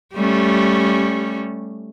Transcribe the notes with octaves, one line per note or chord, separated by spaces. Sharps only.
G3 A3 C#4